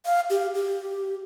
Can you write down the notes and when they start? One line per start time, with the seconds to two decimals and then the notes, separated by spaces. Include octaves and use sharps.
0.06 F5
0.30 G4
0.55 G4